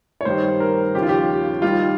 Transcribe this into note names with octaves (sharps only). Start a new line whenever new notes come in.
C#5
G2 D#3 G3 C5
A#4
D#2 C#3 F3 G4
F4
G4
D#2 D#3 G3 F4